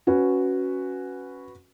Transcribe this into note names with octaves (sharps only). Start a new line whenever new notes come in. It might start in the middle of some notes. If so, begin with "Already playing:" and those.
C#4 F#4 B4